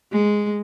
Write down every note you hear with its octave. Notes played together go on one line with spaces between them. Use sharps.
G#3